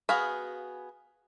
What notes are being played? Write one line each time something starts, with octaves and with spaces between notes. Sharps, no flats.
B3 F#4 G#4 F5 B5